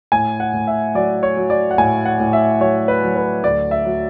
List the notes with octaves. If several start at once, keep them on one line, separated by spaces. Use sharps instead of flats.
A2 G#5
F#5
A2
E5
F#3 D5
C#5
F#3
D5
F#5
A2 G#5
F#5
A2
E5
F#3 C#5
B4
F#3
B4
D2 D5
E5
F#3